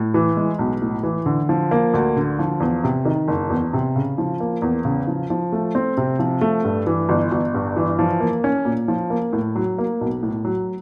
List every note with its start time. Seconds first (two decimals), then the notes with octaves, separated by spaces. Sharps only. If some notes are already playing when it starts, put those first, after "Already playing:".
Already playing: A2
0.14 E3
0.37 G#3
0.59 B1
0.82 A2
1.03 E3
1.26 D3
1.49 F3
1.71 A#3
1.94 D2
2.17 D3
2.39 F3
2.60 E2
2.84 C3
3.05 D#3
3.28 F#1
3.50 E2
3.73 C3
3.96 C#3
4.18 F3
4.40 A#3
4.62 E2
4.85 C#3
5.07 F3
5.30 F3
5.52 A3
5.75 C4
5.97 C3
6.19 F3
6.41 A3
6.64 G2
6.87 E3
7.09 G1
7.32 G1
7.54 G2
7.76 E3
7.99 F3
8.20 A#3
8.44 C#4
8.65 A#2
8.88 F3
9.10 A#3
9.33 A2
9.56 F#3
9.78 A#3
10.01 B1
10.23 A2
10.45 F#3